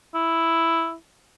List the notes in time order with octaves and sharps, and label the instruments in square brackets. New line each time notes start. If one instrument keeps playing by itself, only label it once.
[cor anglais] E4